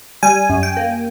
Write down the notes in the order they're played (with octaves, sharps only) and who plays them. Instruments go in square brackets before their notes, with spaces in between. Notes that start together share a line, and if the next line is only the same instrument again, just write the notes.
[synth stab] G3 G#5
F#2
G5
A#3